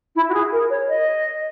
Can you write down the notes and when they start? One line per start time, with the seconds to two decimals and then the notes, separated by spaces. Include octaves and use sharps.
0.15 E4
0.28 F#4
0.33 G#4
0.52 A#4
0.70 C#5
0.88 D#5